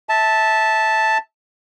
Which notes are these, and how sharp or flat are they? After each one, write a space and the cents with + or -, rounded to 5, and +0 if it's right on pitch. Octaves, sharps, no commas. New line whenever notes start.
E5 -20 A5 +0